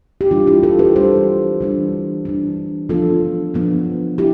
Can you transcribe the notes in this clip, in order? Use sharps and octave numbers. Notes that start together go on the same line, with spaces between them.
G4
E3 G3 D4 F4
E4 G4
F4 A4
G4 B4
E3 G3 D4 A4 C5
E3 G3 D4
E3 G3 D4
F3 B3 D4 F4 A4
F3 B3 D4
E4 G4